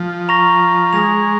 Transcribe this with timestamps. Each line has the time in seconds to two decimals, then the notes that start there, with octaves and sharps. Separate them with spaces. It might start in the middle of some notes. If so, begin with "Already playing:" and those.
Already playing: F3
0.29 A#5 C#6 A#6 F7
0.93 G#3 D#6 A#6 F7